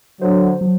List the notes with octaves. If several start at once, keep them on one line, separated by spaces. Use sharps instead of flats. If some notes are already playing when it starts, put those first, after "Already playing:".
D3 F#3 C5
F#3